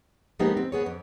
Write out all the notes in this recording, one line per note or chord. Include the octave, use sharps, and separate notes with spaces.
F3 G#3 A#3 B3 D#4 G4
C4
B3 G#4 C#5
F2